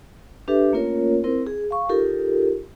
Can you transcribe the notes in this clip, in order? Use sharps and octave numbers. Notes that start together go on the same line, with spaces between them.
D4 G4 A4 B4 E5
A3 A#3 C#4 F4 A#4 C#5
C4 E4 A#4 C5
G#4
F5 C#6
D#4 F4 G4 A4 A#4